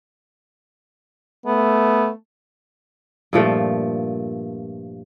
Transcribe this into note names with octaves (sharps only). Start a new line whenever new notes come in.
A3 B3
G2 A#2 F3 A3